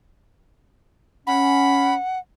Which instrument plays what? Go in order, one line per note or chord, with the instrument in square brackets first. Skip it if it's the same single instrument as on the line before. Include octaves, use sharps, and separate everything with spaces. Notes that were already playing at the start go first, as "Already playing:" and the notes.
[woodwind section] C#4 [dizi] F#5 [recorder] B5